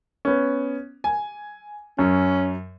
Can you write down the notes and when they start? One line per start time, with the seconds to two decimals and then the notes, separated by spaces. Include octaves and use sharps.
0.25 B3 C#4
1.04 G#5
1.99 F#2 C#4